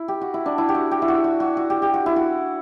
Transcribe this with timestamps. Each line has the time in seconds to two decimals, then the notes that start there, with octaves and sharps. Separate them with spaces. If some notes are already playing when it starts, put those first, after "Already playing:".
Already playing: E4
0.08 G4
0.21 F#4
0.34 E4
0.46 D4
0.58 E4
0.69 G4
0.75 F#4
0.91 G4
1.02 E4
1.08 F#4
1.24 F#4
1.40 F#4
1.57 F#4
1.70 G4
1.82 G4
1.94 F#4
2.06 E4
2.16 F#4